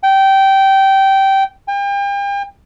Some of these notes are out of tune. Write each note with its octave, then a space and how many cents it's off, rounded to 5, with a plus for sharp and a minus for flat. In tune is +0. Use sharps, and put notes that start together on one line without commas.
G5 -15
G5 +40